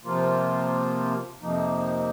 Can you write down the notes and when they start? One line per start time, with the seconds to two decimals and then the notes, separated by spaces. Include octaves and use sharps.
0.04 C3 F3 A#3 F4
1.41 F2 C3 F3 A#3 D#4